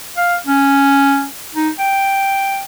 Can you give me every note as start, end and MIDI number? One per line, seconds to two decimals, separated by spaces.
0.17 0.36 77
0.47 1.26 61
1.55 1.69 63
1.79 2.63 79